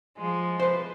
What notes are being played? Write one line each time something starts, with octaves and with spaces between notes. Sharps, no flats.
F3 G#3
B4 C5